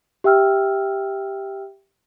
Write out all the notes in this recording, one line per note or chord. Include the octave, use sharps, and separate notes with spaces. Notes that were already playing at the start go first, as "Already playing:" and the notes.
G4 E5 G5 E6 F6